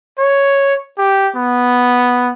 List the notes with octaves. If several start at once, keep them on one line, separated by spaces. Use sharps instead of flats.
C#5
G4
B3